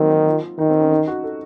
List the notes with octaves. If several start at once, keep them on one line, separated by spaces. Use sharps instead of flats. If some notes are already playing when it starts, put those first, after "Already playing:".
Already playing: D#3 F#3 A#3 C4
D#4
F4
D#3 D#4
C4
C#4
D#4
F#4
A4